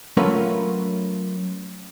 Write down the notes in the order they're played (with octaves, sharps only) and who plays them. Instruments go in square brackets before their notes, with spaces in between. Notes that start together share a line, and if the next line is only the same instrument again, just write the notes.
[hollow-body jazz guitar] F#3 A3 C#4 F4 A#4 B4